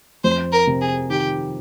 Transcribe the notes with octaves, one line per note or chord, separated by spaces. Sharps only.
F2 C5
A#4
C3
G#4
D#3 G4